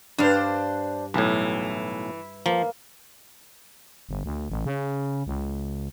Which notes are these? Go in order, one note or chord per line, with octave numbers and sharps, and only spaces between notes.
G2 D4 C5 F5
B1 A2 E3
F3 A#3
G1
D2
A1
C#3
C#2